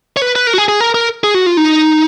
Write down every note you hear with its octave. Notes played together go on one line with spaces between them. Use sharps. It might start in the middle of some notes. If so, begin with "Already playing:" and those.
C#5
B4
B4
A#4
F#4
G#4
G#4
A#4
A#4
G#4
F#4
F4
D#4